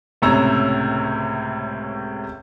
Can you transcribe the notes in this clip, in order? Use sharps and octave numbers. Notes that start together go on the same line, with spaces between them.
C#2 A2 C3 C#4 A#5 E6